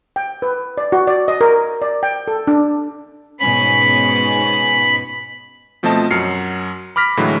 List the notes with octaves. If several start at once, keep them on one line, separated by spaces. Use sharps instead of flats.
G5
B4
D5
F#4
D5
D#5
A#4
D5
G5
A4
D4
G#2 B2 C#4 B5
B2 F3 A3 C4 D#5 A5
F#2 F#3 F6 C7 C#7
B5 D6 F6 A#6 B6
A2 D3 E3 F#3 G#3